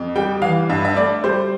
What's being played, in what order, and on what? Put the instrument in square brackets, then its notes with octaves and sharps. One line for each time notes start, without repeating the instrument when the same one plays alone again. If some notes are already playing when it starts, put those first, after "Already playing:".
Already playing: [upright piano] F2
G3 G5
E3 F5
G2 E5
E5
A3 D5
G3 C5